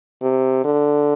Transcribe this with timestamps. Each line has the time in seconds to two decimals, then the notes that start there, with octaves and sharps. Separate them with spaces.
0.22 C3
0.65 D3